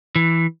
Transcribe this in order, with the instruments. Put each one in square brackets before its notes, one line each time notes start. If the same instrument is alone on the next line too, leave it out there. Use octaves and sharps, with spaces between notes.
[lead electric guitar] E3